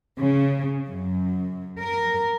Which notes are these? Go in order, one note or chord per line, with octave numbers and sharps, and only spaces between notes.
C#3
F#2
A#4